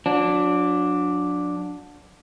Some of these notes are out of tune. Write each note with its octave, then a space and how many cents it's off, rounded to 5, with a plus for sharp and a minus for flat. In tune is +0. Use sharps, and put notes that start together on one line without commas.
F#3 -35 D4 +0